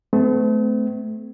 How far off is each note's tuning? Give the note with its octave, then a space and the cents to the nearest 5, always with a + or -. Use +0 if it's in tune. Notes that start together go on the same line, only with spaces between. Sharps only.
A3 -20 C4 -45